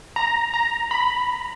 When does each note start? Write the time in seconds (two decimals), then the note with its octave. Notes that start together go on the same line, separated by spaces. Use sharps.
0.16 A#5
0.54 A#5
0.91 B5